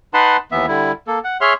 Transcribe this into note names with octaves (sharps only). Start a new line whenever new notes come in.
D#4 B4 F#5 A5 B5 C6
D#2 E3 B3 E5
D3 G3 E4
A#3 A4
F#5
G#4 C#5 E5 C6 F6